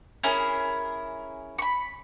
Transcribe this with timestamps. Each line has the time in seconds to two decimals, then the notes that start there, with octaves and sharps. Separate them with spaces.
0.24 C#4 E4 G#4 A#4
1.59 B5 C#6